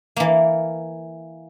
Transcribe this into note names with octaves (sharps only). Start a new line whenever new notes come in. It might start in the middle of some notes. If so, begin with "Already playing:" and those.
E3 A#3